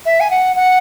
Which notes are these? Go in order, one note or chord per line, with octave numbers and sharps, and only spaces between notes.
E5
G#5
F#5
F#5